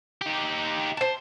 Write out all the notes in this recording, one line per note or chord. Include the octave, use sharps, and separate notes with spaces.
D#4 G4
C5 A5